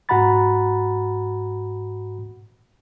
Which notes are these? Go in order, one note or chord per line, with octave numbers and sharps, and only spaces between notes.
G#2 F#4 F#5 A#5 B5 A6